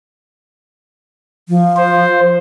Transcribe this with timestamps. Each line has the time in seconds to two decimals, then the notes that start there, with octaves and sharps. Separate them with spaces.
1.49 F3
1.77 C5